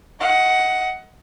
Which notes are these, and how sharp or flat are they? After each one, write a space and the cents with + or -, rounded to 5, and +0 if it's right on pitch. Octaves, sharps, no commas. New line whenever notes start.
D#5 +25 F#5 +5